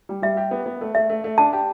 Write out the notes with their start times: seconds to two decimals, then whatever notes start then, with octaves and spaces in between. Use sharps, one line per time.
0.09 G3
0.22 G3 E5
0.37 G4
0.51 B3
0.66 B3
0.81 A3
0.95 A3 E5
1.09 A3
1.24 A3
1.38 D4 A5
1.53 G4